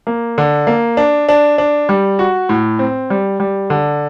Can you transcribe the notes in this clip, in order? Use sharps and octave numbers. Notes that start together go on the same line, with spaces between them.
A#3
D3
A#3
D4
D4
D4
G3
F#4
A2
C4
G3
G3
D3